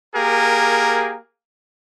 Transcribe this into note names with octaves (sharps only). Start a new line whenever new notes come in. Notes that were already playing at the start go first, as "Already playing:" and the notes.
A#3 G4 G#4 A#4